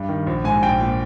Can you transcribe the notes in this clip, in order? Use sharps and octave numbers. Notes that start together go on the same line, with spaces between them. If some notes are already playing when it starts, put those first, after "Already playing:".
Already playing: G2
D#3
A#1
G#2 G#5
A#1 G5
A#2